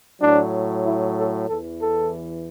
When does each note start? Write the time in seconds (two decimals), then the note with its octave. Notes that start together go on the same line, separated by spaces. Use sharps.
0.21 A2 F#3 D4
0.84 E4
1.16 A4
1.47 E2 E3 A4
1.80 A4